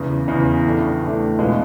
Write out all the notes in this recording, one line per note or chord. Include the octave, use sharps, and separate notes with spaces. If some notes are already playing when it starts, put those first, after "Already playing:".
Already playing: E2 C#3 E3
E2 C#3 E3
A2 E3 A3 D4
A2 E3 A3 D4
B2 G#3 B3 D4 F4